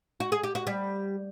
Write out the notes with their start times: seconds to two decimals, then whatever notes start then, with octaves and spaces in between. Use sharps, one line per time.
0.20 F#4
0.32 G#4
0.43 G4
0.55 F#4
0.67 G3